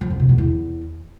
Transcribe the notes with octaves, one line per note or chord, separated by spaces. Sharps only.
F3
F#2
C3
B2
E2